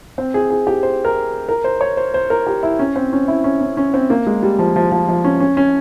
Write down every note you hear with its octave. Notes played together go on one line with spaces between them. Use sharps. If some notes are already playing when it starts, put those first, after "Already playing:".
C4
G#4
G#4
G4
C5
A#4
A#4
C5
C#5
C5
C5
A#4
G4
E4
C#4
C4
C#4
E4
C#4
C#4
C#4
C4
A#3
G#3
G3
F3
F3
F3
F3
C#4
C#4
C#4